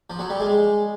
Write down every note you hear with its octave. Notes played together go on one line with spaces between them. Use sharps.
F3
F#3
G3
G#3